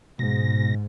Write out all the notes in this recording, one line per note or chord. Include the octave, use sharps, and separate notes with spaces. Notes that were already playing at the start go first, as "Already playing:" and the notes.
G#2 B2 A#6